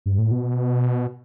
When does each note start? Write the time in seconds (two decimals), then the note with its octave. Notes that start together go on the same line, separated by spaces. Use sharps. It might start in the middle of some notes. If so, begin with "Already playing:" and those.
0.06 G2
0.18 A2
0.31 B2